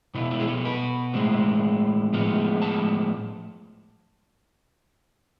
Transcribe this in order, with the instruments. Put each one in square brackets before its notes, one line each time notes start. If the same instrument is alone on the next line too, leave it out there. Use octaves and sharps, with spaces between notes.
[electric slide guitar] B2 B3 E4
E4
G#4
A4
B4
A2 G#3 C4
A2 F3 G#3 B3
A5